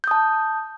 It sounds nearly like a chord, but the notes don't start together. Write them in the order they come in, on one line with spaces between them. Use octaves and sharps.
G6 D#6 A5